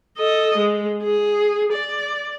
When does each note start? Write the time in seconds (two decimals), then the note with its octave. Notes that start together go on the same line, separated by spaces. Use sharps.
0.18 A4 D#5
0.57 G#3
1.02 G#4
1.73 D5